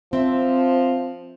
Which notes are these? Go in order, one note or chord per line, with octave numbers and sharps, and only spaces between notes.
F3 C4 E5